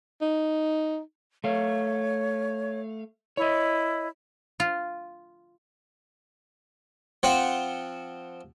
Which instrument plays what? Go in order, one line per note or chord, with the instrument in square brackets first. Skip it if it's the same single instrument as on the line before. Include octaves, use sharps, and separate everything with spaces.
[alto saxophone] D#4
[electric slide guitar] A3 F5 [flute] C#5
[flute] E4 [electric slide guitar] C#5 D#5
[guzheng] F4
[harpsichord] F3 C4 C5 F#5